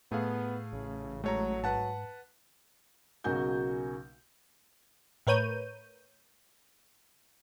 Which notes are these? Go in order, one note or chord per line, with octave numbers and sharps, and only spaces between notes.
A2 A3 B3 G#4 F5
A1 C#3
F#3 G#3 A3 C#5 A#5
G#2 B4 F#5 A5
B1 C#3 A#3 F#4 G#5 G6
A2 A#4 B4 C#5 G6 D#7